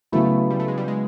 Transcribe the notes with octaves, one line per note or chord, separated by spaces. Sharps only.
C#3 F#3 A3 B3 E4
G3
A3
G#3
G3
G#3